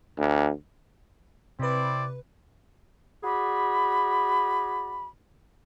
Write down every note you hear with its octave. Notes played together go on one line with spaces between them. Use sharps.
D2
C3 C4 E4 B4 D5
F#4 G#4 D5 B5